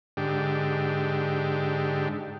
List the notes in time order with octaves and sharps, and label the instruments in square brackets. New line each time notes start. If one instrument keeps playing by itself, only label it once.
[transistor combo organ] G#2 D3 G4